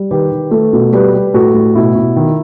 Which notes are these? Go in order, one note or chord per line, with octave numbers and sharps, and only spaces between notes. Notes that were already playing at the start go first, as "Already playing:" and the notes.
Already playing: G3
D#3 G4 B4
D#3
A3
B2
G3 G4 B4
G3
A2 F#4 A4
A2
B2 E4
B2
D#3